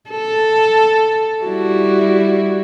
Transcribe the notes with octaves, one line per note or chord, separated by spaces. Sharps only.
A4
G3 E4 F#4